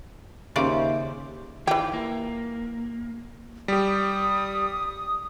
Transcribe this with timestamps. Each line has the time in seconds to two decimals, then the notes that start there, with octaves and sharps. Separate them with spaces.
0.56 D#2 C#3 C5 D5 E5
1.67 D#3 E3 F4 G4
1.94 A#3
3.68 G3 G4 D#6